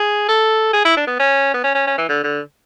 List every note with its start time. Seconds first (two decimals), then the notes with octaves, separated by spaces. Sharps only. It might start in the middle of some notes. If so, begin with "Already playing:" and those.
Already playing: G#4
0.29 A4
0.73 G#4
0.85 E4
0.97 D4
1.07 B3
1.19 C#4
1.54 B3
1.64 C#4
1.75 C#4
1.87 C#4
1.98 E3
2.09 D3
2.24 D3